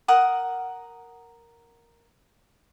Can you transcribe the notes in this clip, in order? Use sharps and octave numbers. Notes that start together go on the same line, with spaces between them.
A#4 F#5 D#6